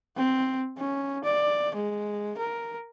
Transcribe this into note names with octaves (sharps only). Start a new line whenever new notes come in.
C4
C#4
D5
G#3
A#4